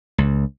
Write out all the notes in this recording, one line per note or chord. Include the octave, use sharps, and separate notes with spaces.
C#2